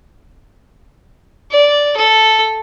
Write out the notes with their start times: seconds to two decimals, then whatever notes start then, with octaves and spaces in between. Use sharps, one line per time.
1.51 D5
1.97 A4